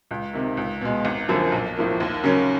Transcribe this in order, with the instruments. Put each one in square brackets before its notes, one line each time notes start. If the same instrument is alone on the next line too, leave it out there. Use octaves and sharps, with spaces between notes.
[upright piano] C#2
C3 D#3
C#2
B2 G#3
G#1
F#2 D3 F3 A#3
B1
A2 F3 A#3
D#2
C#3 F#3 A#3 C#4